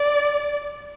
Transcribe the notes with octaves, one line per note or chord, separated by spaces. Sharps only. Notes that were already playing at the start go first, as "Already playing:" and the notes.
Already playing: D5